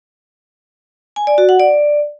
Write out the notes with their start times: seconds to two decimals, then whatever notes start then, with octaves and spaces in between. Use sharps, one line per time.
1.16 G#5
1.27 D5
1.38 F#4
1.49 F#5
1.60 D5